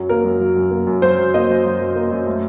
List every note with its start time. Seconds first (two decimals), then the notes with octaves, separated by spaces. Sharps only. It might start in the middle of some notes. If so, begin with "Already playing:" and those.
Already playing: F#2 F#3
0.09 A#3 A#4
0.25 F#2
0.40 F#3
0.56 F#2
0.71 A#3
0.87 F#2
1.02 F#3 C5
1.19 F#2
1.34 A#3 D#5
1.49 F#2
1.64 F#3
1.81 F#2
1.96 A#3
2.11 F#2
2.27 A3